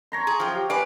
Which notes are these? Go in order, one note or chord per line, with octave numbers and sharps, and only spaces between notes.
C#5 A#5 C6
G#4
F#2 F3 G5
G4
B4 D5 F5 G#5